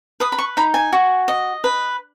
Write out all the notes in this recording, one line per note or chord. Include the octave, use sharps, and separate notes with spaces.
B4 D#6
B5
C#6
D#4 B5
G#5
F#4
D#5
B4